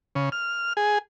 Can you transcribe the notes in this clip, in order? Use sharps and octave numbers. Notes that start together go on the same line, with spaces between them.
C#3
F6
G#4